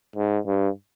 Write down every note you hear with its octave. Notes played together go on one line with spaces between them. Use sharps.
G#2
G2